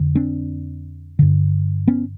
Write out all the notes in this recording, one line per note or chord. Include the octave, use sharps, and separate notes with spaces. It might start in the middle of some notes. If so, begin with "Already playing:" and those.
Already playing: F2 D3
C4 D4
G2 D3
B3 C#4